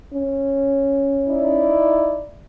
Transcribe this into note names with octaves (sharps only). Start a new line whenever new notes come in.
C#4
D#4 E4 D5